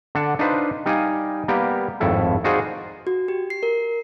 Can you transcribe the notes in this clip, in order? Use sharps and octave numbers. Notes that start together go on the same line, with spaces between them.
D3 D4 D5 F#5 A5
D4 D#4 F4 B4 C5
G3 D#4 D5 F5 G#5
G3 A#3 B3 G4 A#4
G#1 F2 A2 E4 A4
D#4 F4 F#4 G#4 C5 D5
F#4
G4
C7
A#4